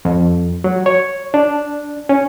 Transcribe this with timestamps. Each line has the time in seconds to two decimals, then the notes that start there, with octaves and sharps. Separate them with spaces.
0.05 F2
0.64 F#3
0.86 C#5
1.34 D4
2.09 C#4